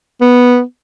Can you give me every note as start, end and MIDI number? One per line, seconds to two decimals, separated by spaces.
0.21 0.61 59